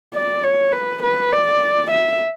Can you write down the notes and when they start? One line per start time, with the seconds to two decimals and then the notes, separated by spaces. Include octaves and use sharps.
0.14 D5
0.44 C#5
0.72 B4
1.03 B4
1.33 D5
1.91 E5